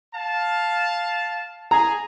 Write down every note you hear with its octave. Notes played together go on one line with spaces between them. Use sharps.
F5 A5
G#4 A#5